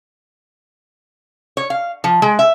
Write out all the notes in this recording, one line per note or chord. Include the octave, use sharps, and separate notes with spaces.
C#5
F5
F3
G#3
E5